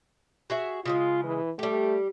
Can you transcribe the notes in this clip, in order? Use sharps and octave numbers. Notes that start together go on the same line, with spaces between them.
F#4 G#4 E5
C#3 G3 G#3 F4
E3
G3 A3 G4